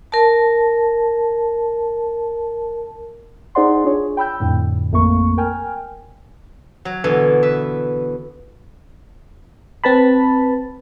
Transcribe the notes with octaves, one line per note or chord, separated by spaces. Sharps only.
A#4 A5
D#4 G#4 C5 D5 F#5 C6
D4 F4 G#4 C#5
G5 B5 E6 G6
F2 A2 D3
A1 F2 A3 A#3 C#6
A#4 G5 G#5 F6
F#3
B2 D3 E3
B4 E5
C4 B4 A5 B5